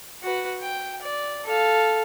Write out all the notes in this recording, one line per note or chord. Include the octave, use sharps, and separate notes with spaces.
F#4 B4
G5
D5
A4 F5